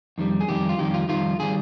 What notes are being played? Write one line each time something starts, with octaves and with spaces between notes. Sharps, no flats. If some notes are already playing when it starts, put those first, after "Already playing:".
F2 D#3 G3
G#4
F2 D#3 G3 G4
F4
F2 D#3 G3 G4
F4
F2 D#3 G3 F4
D#3 G3 G#4